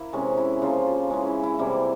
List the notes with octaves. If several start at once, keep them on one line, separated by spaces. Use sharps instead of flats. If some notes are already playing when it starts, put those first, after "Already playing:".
Already playing: A#3 E4 A#4
C3 E3 G#3 C#4
E4
C#3 F3 A#3 F4
F4
E3 G#3 C#4
E4
E4
C3 E3 G3 A#3 E4